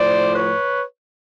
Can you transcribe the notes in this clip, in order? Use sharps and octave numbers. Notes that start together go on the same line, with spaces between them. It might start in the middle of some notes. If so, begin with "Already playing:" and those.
Already playing: A2 F3 C5 D5
B4 C#5